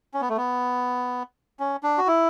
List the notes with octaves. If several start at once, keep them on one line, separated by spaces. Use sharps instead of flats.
C#4
B3
A3
B3
C#4
D4
F#4
E4